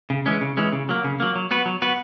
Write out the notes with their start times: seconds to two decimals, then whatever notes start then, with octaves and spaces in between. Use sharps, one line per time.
0.10 C#3
0.26 E3 G#3 C#4
0.41 C#3
0.57 E3 G#3 C#4
0.73 C#3
0.89 F#3 A#3
1.04 C#3
1.20 F#3 A#3
1.36 F#3
1.51 B3 F#4 B4
1.66 F#3
1.82 B3 F#4 B4